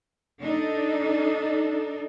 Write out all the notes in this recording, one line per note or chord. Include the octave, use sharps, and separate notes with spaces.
D4 D#4 A4